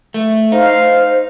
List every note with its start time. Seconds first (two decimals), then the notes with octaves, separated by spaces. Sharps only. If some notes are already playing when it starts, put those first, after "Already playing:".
0.14 A3
0.52 D#4 C5 F5